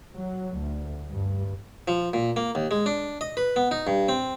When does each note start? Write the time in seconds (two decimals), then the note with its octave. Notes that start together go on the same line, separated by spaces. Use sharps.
0.15 F#3
0.58 D2
1.08 G2
1.88 F3
2.14 A#2
2.36 A#3
2.55 D#2
2.71 G#3
2.86 D4
3.21 D#5
3.37 B4
3.56 B3
3.71 D#4
3.87 G2
4.09 C4